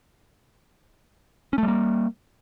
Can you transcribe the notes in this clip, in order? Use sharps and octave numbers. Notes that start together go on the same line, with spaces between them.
G3 A3 A#3 C#4